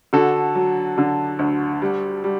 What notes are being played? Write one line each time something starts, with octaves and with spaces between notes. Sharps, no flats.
D3 F#4 A4
F#3
D3
D2
G3
G3